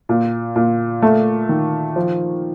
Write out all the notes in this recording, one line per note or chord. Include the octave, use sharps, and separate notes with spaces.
A#2
A#2
A3
D#3
F3